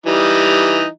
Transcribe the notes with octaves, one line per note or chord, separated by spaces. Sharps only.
E3 G3 D#4